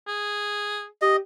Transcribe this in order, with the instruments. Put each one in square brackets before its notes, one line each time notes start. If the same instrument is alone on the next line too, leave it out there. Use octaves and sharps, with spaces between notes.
[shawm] G#4
[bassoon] G4 [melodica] D#5